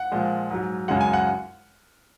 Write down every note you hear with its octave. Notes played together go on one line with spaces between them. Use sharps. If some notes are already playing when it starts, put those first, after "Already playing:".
Already playing: F#5
A#2 F3 G#3
G#2 F#3
F#2 C#3 G#3 F#5
G#5
F#5